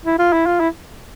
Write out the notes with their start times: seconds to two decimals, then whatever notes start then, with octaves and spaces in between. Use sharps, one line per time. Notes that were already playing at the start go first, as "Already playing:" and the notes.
0.05 E4
0.19 F4
0.33 E4
0.46 F4
0.60 E4